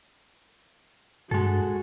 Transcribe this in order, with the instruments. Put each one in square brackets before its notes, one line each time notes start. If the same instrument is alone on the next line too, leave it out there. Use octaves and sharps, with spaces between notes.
[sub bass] G2 [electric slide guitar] G#3 A4 [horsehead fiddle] F#4